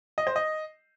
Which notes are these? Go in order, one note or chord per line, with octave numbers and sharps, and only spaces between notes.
D#5
C5
D#5